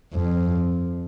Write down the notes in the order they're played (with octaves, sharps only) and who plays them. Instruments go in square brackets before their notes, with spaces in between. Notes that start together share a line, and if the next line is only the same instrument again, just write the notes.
[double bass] F2